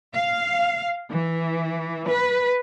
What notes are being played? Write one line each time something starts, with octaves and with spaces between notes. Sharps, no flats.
F5
E3
B4